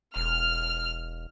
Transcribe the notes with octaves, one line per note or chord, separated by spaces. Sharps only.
E1 F6